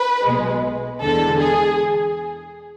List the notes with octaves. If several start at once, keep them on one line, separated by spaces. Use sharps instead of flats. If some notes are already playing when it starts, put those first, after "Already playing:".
Already playing: B4
B1 B2 G#3
E2 D3 G#3 A4
G#4